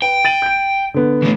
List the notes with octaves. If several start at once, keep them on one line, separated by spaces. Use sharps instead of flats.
B4 G5
A6 D#7 F#7
G6 D7
D3 B3
E3 A3